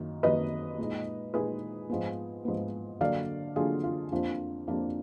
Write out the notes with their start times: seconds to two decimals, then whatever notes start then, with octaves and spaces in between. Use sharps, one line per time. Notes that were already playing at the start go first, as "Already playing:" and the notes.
Already playing: F#2 D#3 A#3
0.23 F#2 D#3 A#3 B4 D#5
0.78 A#2 G#3 D#4
1.34 A#2 G#3 D#4 G#4 B4
1.90 G#2 F3 B3
2.45 G#2 F3 B3
3.00 D3 F#3 A#3 D4 D5 F5
3.56 D3 F#3 A#3 D4 F4 G#4
3.84 F4
4.12 F2 F3 A#3 D4
4.67 F2 F3 A#3 D4